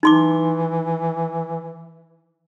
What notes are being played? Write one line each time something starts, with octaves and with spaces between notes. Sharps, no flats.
E3 D#4 C6 D6